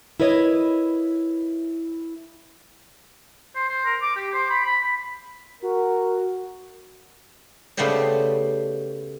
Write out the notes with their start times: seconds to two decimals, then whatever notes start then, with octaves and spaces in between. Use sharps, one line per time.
0.20 E4 A#4 B4 C#5 D#5
3.55 C5
3.69 C5
3.85 A#4
4.02 D6
4.16 G4
4.34 C5
4.50 B5
4.64 B5
4.83 B5
5.62 F#4 A#4
7.77 C#3 A3 B3 G4 C5 D5